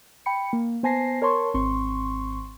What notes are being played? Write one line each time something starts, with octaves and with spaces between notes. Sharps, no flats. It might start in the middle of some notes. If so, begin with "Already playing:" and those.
G5 B5 C#7
A#3
B3 C5 G#5 A5 A#6 C7
A#4 C#5 A5 C6 C#6
G#1 C4 C6 C#6